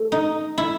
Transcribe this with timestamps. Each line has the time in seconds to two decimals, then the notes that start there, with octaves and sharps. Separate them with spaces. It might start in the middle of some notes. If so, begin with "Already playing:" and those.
Already playing: A3
0.12 D#4
0.58 E4